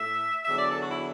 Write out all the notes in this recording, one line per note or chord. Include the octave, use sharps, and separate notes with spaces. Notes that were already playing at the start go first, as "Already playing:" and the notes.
Already playing: A2 A3 E5
E2 D3 F#3 E5
D5
A4
F#4
E4